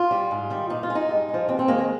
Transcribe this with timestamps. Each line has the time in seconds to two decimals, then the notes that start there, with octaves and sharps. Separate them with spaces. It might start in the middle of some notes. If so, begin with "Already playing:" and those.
Already playing: F4
0.11 G3
0.31 G#2
0.50 D#3 G3
0.70 A#2 D#4
0.83 F4
0.90 G#3
0.95 D#4
1.09 G2
1.29 G#3
1.34 F3
1.48 D#2 C4
1.59 C4
1.68 D#3 G#3 A#3
1.78 C4